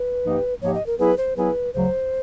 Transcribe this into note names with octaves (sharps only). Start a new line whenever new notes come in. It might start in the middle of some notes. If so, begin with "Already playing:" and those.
Already playing: B4
G#2 F3 A#3 D#4 G4
G#2 F3 A#3 D#4 G4 C#5
D#5
A#4
F#3 B3 E4 G#4 B4
C5
F#3 B3 E4 G#4 B4
D2 C#3 F#3 C5